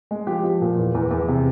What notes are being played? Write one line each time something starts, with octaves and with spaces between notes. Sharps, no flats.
G#3
F3 G4
F3
A#2
E2
E2
E2
C3